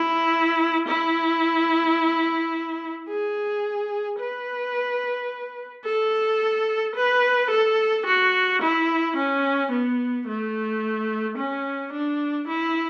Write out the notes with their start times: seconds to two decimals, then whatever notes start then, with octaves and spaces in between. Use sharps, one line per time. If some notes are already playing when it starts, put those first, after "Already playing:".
Already playing: E4
0.88 E4
3.09 G#4
4.20 B4
5.85 A4
6.96 B4
7.51 A4
8.06 F#4
8.62 E4
9.17 C#4
9.72 B3
10.28 A3
11.38 C#4
11.93 D4
12.48 E4